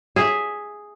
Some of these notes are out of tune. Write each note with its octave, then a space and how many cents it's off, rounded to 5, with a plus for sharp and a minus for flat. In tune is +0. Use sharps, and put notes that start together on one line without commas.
G#4 +0 E5 +0